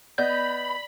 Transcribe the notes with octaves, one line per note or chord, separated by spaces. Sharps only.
B3 D5 D#5 B5 G6